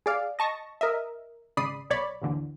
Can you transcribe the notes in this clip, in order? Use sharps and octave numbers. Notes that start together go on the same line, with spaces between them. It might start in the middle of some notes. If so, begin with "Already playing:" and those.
G#4 D5 F5
D#5 A5 C#6 A#6
A#4 D#5 E5
G#1 C#3 D5 B5 D#6 C7
B1 C#5 D5 B5
A1 D#2 D3 E3